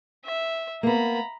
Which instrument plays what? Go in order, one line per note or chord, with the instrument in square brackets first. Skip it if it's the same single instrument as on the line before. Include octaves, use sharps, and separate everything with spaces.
[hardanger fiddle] E5
[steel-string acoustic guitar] A#3 B3 [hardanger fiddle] A#5 B5